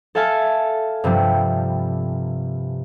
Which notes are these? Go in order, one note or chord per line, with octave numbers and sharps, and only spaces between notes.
A4 E5 F5 G#5 A5
G2 C3 F3 G3